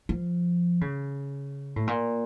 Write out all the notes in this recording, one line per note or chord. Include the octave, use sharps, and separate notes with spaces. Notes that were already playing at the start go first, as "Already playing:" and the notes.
F3
C#3
A2
A#2